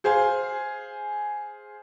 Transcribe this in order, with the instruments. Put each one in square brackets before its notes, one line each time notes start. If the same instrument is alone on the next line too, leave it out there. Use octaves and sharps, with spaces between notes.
[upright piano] G#4 C5 F5 G#5